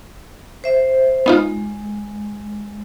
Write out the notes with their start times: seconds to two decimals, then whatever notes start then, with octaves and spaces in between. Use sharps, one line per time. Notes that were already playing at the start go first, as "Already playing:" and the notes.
0.64 C5 E5
1.26 G#3 B3 D#4 F4